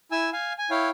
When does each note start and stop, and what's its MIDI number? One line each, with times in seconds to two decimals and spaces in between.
0.12 0.30 64
0.12 0.30 80
0.12 0.30 88
0.33 0.53 77
0.33 0.53 80
0.58 0.70 80
0.71 0.90 64
0.71 0.90 73
0.71 0.90 77
0.71 0.90 79